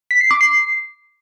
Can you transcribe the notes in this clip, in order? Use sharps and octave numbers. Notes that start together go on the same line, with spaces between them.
B6
C7
D6
C7